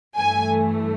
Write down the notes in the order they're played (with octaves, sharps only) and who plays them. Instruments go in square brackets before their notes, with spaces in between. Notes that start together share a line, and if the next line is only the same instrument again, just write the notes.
[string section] G2 E3 A3 G#5